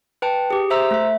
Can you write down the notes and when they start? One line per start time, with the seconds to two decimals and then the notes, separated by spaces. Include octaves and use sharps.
0.22 B4 G5 A5
0.50 G4 G#4
0.70 C5 E5 A#5 E6
0.91 A3 E5